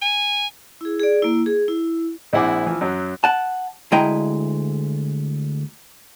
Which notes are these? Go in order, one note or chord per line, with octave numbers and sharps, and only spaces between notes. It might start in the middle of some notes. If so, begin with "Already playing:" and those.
G#5
E4 G#4
G#4 D5
A#3 E4
G#4
E4
A#1 C4 E4 F#5 G#5 D6
E3 F3
F#2 F#3
F#5 A5
D2 G#3 E4 D#5 G5 A#5